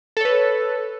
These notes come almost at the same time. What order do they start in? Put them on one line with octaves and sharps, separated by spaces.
A4 C#5 B4